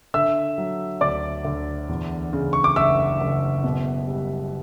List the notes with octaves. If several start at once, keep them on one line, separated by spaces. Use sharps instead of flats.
D3 E5 E6
F#3
D2 D5 D6
D2
E2
C#3
C#6
D6
F#1 E5 E6
F#1
B2
G3